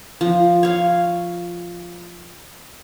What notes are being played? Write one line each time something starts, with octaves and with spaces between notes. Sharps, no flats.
F3
C#5 F5